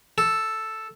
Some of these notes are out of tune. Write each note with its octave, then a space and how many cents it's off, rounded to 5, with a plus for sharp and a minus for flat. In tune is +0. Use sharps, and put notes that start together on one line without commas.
A4 +0